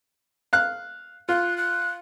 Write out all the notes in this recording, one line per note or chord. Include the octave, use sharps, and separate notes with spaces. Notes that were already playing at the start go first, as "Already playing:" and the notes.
F5 F#6
F4 F#6
F#6